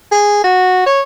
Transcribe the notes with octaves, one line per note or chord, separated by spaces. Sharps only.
G#4
F#4
C#5